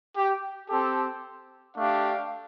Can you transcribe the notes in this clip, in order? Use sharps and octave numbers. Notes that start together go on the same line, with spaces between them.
G4
C4 G4 A4
A3 D4 G4 F5